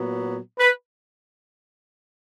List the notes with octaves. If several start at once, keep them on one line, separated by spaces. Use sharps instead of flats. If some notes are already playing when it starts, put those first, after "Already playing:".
Already playing: A#2 F#3 B3
B4